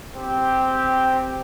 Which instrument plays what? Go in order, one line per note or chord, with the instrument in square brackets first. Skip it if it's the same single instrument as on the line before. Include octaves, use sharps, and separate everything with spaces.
[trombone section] C4 G4